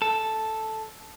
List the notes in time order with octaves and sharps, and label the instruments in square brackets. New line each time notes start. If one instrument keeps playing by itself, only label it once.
[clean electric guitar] A4